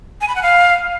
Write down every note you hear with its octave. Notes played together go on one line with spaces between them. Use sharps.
G#5
B5
F#5
F5